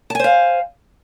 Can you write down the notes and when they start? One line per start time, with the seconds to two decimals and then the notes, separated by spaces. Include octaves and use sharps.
0.10 A5
0.15 G#5
0.20 C5
0.24 F5